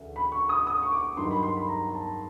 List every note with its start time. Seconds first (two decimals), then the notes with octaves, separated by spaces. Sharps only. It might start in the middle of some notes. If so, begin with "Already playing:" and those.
Already playing: D2 C#3 E3
0.16 B5
0.32 C#6
0.49 D#6
0.67 D#6
0.83 C#6
0.92 D6
1.17 G2 D#3 F#3 C6
1.31 B5
1.43 C6
1.56 B5
1.68 A#5
1.95 A5